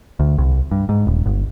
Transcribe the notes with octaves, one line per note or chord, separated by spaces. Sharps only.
D2
C2
G2
G#2
D#1
G1